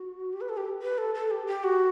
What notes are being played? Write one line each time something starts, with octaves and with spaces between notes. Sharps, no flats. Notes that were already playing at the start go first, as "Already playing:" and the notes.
Already playing: F#4
G4
B4
A4
G4
B4
A4
A4
G4
G4
F#4